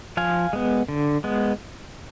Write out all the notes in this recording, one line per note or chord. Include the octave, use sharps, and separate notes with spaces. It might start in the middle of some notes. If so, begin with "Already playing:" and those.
F3 F5 G#5
G#3 B3
D3
G#3 B3